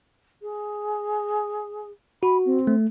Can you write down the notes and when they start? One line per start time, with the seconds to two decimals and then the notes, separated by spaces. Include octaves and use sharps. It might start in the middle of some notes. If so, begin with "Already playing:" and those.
0.42 G#4
2.23 F#4 B5
2.45 C4
2.67 A3